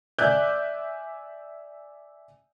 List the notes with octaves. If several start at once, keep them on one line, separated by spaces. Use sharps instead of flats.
D5 E5 G#5 D6 F#6 G6